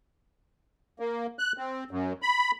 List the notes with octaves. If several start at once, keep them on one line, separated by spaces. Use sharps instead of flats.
A#3
F#6
C4
F#2
B5